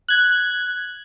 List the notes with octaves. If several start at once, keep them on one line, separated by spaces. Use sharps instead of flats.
F#6 G#6